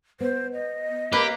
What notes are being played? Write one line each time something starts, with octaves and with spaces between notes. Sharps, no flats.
B3 C5
D#5
A#3 G4 B4 C#5 E5